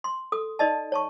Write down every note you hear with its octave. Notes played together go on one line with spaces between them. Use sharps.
C6
A4 D#6
D#4 D5 D#5 A5
C#5 A5 C#6